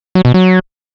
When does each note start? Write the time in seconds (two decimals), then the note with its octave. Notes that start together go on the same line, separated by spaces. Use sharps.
0.15 F#3
0.25 B2
0.34 F#3